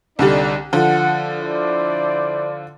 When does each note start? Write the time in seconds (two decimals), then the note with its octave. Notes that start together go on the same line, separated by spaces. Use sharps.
0.19 C2 D3 G3 D#4 D5
0.73 D3 F3 F#5
1.40 E4 C5 D5